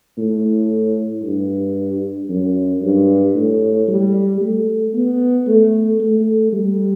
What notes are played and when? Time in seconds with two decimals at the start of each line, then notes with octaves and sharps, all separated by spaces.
0.18 A2
1.23 G2
2.29 F#2
2.82 G2
3.35 A2
3.88 G3
4.41 A3
4.94 B3
5.47 A3
6.00 A3
6.53 G3